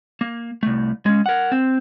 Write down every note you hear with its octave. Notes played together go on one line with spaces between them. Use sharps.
A#3
C2 A3
G#3 C#4
A#4 F#5
C4